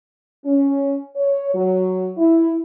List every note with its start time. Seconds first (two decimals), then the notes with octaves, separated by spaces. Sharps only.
0.45 C#4
1.16 C#5
1.54 F#3
2.18 E4